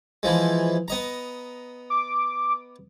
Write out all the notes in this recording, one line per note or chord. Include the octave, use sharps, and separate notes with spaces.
E3 F3 G#3
B3 D#5 A#5
D6